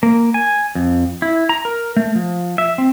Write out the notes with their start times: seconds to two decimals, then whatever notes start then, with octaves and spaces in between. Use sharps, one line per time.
0.03 A#3
0.34 G#5
0.75 F2
1.22 E4
1.49 A#5
1.65 A#4
1.96 A3
2.15 F3
2.58 E5
2.78 C4